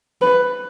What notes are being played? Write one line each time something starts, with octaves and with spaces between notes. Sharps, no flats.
B4